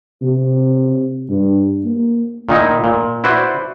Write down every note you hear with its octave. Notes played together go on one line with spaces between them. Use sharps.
C3
G2
A#3
A#2 D#3 D#4 E4
A#2
E4 F#4 B4 C5 D5